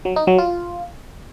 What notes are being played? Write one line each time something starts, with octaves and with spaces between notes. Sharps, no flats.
F#3
D#4
F#3
F4